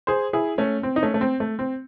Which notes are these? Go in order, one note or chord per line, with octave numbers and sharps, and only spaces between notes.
G#4 C5
E4 G#4
A3 C#4
C4
D#4
A3 C#4
A3
C4
A3
C4